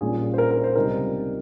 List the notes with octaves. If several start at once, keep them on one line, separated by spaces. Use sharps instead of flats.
A#1 A#2 G3 C#4 G#4
C5
A#4
A#4
C5
C#2 C3 G3 A#3 D#4 A#4